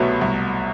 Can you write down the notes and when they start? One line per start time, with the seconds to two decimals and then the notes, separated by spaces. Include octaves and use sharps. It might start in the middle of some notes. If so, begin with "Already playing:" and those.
Already playing: C2 B2 F#3 A3 B3
0.21 C2